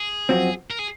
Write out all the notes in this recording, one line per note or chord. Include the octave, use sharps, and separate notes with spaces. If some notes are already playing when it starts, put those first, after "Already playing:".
Already playing: G#4
F#2 F3 C4 F#4
A#4
G#4